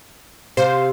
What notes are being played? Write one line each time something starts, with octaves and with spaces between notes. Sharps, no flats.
C3 C5 F5